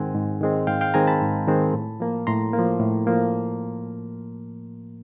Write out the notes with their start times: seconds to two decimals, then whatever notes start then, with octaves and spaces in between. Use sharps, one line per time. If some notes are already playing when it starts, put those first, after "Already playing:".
Already playing: G#2 D#3 G#3 C4 F#5 G#5
0.15 G#2
0.41 D#3 G#3 C4
0.67 G#2 F5 G5
0.81 F5 G5
0.94 D#3 G#3 C4 G#5 A#5
1.07 A5 B5
1.21 G#2
1.48 D#3 G#3 C4
1.74 A2
2.00 F3 A#3
2.27 A2 A#5 C6
2.53 A#3
2.58 F3
2.79 A2
3.07 F3 A#3